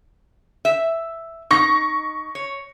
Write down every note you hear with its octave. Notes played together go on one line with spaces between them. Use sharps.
E5
D#4 C#6 A#6
C#5